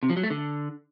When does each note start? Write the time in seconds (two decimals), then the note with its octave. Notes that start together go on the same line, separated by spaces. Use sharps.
0.03 C3
0.10 F3
0.17 F#3
0.23 A3
0.30 D3